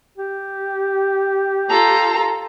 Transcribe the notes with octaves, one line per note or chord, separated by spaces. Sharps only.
G4
F4 A4 A#5